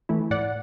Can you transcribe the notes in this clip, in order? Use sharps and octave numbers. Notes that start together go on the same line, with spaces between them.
E3 A3 E4
A2 D5 F#5